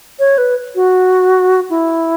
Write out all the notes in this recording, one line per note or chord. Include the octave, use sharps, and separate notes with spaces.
C#5
B4
F#4
E4